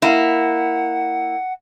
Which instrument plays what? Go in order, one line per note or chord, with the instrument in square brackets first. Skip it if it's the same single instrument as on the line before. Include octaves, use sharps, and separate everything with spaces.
[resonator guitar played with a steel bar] A#3 E4 [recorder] F#5